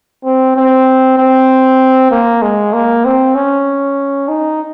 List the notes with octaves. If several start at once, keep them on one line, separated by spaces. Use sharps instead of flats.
C4
C4
C4
A#3
G#3
A#3
C4
C#4
D#4